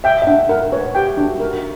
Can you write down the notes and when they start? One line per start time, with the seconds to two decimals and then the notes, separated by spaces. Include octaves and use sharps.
0.04 E5 G5
0.22 E5
0.27 D4 F#5
0.49 A#4 F#5
0.72 B4 C#5
0.95 G4 G5
1.17 D4 F#4
1.40 F#4 A#4